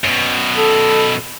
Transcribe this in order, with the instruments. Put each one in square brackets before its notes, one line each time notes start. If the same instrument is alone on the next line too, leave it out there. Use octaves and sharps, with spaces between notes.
[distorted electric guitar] F#2 B2
[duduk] A4